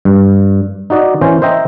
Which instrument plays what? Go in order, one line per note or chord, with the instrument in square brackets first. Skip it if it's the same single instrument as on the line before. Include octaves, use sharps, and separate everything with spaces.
[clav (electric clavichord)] G2
D#4 F#4 D5 D#5
E3 C#4 C5
C5 D#5 E5 G5 A#5